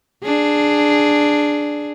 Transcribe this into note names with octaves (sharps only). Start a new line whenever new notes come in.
D4 G#4